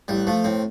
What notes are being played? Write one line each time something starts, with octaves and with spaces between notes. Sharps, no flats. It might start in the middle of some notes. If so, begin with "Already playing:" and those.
A1 G3
F3 A3
A2 C4